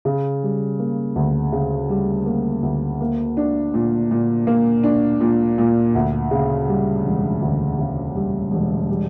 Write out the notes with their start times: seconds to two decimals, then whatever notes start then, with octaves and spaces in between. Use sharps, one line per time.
0.05 C#3
0.43 G3
0.79 A#3
1.16 D2
1.52 C#3
1.89 G3
2.26 A#3
2.63 D2
3.01 A#3
3.37 D4
3.74 A#2
4.11 A#2
4.47 A#3
4.83 D4
5.20 A#2
5.58 A#2
5.95 D2
6.31 C#3
6.68 G3
7.04 E1
7.42 D2
7.79 C#3
8.15 G3
8.51 E1
8.89 G3